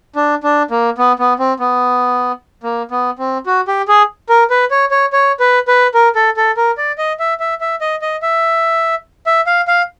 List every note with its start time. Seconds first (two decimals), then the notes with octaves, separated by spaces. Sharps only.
0.16 D4
0.43 D4
0.71 A#3
0.98 B3
1.19 B3
1.39 C4
1.60 B3
2.63 A#3
2.91 B3
3.19 C4
3.46 F#4
3.68 G4
3.88 G#4
4.29 A#4
4.50 B4
4.71 C#5
4.91 C#5
5.13 C#5
5.40 B4
5.68 B4
5.94 A#4
6.15 A4
6.37 A4
6.57 A#4
6.77 D5
6.98 D#5
7.19 E5
7.40 E5
7.61 E5
7.81 D#5
8.02 D#5
8.22 E5
9.26 E5
9.47 F5
9.68 F5